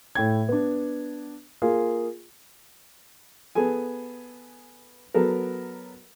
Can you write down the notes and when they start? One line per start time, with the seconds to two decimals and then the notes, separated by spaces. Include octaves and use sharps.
0.15 A2 G5 G#6
0.49 B3 D4
1.62 A#3 F4 G#4
3.55 B3 G#4 A4 G#5
5.14 F#3 B3 A4 A#4